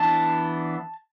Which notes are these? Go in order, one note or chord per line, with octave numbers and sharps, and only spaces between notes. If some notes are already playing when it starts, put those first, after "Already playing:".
Already playing: E3 B3 D4 A5